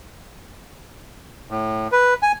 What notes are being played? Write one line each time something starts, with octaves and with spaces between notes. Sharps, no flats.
A2
B4
G#5